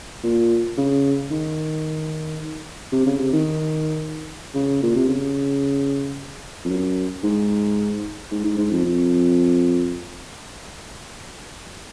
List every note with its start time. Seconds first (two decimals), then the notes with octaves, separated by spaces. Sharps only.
0.23 A#2
0.77 C#3
1.31 D#3
2.92 C3
3.06 C#3
3.19 C3
3.33 D#3
4.54 C#3
4.83 A#2
4.96 C3
5.08 C#3
6.65 F2
6.69 F#2
7.23 G#2
8.31 G#2
8.44 G#2
8.58 G#2
8.71 F2
8.85 F2